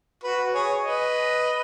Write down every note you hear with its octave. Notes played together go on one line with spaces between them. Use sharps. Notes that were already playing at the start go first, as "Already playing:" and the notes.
F#4 B4
G#4 C#5
B4 D#5